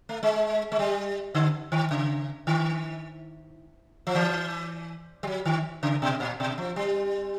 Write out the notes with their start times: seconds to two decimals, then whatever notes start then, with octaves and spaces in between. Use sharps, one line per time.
0.09 A3
0.23 G#3
0.72 G#3
0.79 G3
1.35 D3
1.72 D#3
1.91 C#3
2.47 D#3
4.07 F3
4.15 E3
5.23 G3
5.27 F#3
5.46 D#3
5.83 C#3
6.02 B2
6.20 A#2
6.40 B2
6.58 F3
6.76 G3